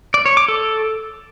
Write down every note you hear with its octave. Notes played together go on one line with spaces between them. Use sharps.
D5
C#5
D6
A4